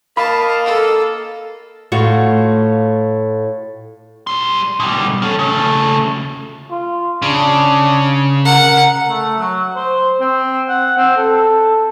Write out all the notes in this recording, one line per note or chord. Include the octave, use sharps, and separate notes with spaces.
A#3 D#5 F5 A5 B5
A4
A2 F4 F#4
G3 C6
B2 G3
C#4 A4
C#3 A3
F4
C#3 D4
A#4 F#5
A3
F#3
C5
C4
F#5
C4
A4